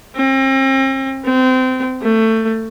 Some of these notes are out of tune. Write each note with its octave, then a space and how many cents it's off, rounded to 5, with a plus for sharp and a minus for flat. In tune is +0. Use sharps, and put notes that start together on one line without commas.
C4 +40
C4 -25
A3 +20